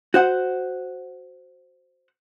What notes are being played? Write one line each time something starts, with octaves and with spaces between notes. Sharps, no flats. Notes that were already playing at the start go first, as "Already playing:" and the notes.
F#4 C5 F#5